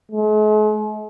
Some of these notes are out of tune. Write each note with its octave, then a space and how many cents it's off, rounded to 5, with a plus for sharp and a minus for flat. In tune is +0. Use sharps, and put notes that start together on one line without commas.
G#3 +45